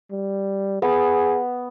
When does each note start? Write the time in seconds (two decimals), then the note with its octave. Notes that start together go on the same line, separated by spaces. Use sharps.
0.11 G3
0.82 B3 G#4